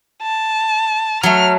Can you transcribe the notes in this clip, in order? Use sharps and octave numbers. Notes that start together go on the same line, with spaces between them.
A5
F#3 A3 F6